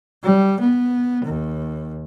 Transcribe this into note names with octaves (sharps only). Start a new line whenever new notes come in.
G3
B3
D#2